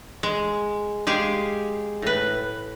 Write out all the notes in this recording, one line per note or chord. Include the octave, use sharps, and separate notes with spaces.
G#3
G#3 G4 G#4 F5
A2 B4